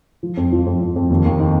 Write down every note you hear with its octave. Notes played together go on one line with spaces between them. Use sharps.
F3
F2
F3
F2
F2
F2
D#2
D#2
D#4